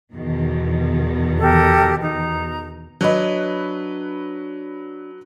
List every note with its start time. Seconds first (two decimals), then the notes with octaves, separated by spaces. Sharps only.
0.13 E2 B2 D#3
1.40 G4 A4 A#4
2.02 D#4 A#5
3.01 F#3 D4 B4 C#5 D#5